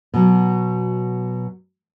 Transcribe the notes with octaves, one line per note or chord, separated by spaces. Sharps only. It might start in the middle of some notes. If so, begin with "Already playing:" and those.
B2 F#3